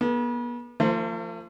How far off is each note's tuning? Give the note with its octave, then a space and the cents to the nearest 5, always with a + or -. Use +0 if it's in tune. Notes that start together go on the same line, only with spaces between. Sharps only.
B3 -40 A4 -35
F3 -20 A3 +45 C5 +0